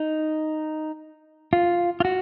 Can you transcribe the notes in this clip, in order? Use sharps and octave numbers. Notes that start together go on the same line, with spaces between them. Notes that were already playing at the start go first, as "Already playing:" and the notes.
Already playing: D#4
F4
F4
F#4